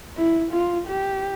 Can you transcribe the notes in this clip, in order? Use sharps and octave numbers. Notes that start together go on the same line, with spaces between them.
E4
F4
G4